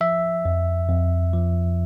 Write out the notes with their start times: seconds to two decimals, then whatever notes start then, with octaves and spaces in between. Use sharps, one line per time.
0.01 F3 E5
0.45 F2
0.89 F2
1.34 F3